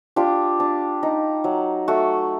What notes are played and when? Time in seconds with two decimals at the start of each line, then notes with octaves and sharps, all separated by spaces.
0.16 D4 F4 G4
0.60 D4
1.03 D#4
1.44 F#3
1.88 A3 F#4